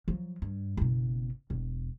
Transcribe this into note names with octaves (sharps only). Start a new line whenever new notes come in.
F3 F#3
G2
F#1 B2
E1